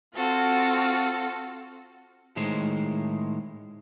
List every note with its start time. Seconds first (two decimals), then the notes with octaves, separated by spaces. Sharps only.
0.13 C4 F4 F#4 A4
2.36 A2 D#3 G#3 C5